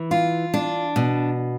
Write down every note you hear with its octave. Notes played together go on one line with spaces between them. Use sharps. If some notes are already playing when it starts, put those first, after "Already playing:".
Already playing: E3
F4
D4
B2